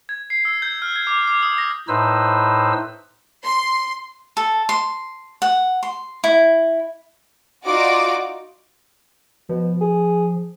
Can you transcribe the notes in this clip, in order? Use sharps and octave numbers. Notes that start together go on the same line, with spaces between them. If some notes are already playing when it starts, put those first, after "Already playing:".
G#6
C7
E6
G6
F6
G#6
D6
D6
D#6
A#6
A2 D#4 B4 C5 E6
C6
A4
C6
F#5
C6
E4
D#4 F4 F#4 D5 D6
B2 F3
G#4